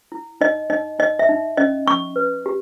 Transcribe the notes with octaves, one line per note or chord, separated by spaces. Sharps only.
E4
D#4 D#5
D#4 D#5
D#4 D#5
E5
D#4
C#4 D#5
C#4 C#6
B4
G4